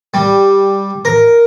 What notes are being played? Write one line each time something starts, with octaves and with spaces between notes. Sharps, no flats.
G3
A#4